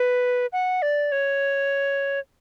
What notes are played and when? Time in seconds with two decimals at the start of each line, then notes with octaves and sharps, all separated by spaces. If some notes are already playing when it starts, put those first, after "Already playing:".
Already playing: B4
0.53 F#5
0.82 D5
1.12 C#5